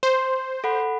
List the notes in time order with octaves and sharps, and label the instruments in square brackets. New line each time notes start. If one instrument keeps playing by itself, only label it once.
[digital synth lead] C5 [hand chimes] C6
[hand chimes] A4 F#5 B5